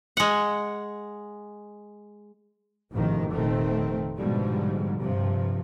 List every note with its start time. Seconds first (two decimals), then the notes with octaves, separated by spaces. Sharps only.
0.17 G#3 F#5
2.92 A1 F2 G#2 B2 D#3 F3
3.32 F1 A#2 D#3 A3 C4
4.18 G#2 B2 D3 F3 G3 G#3
5.00 G2 C3 F3